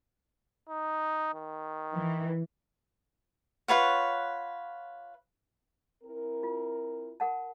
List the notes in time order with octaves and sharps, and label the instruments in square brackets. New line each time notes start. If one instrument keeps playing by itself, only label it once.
[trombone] D#4
D#3
[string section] E3
[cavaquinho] F4 B4 C#5 F#5
[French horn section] C4 E4 A#4
[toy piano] F4
A#4 F#5 A5